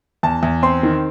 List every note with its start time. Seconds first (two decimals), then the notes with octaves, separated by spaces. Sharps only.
0.23 E2 A5
0.43 E2
0.63 C4 C6
0.83 D#3